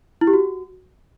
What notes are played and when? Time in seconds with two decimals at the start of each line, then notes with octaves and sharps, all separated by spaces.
0.21 E4
0.27 G4
0.33 F#4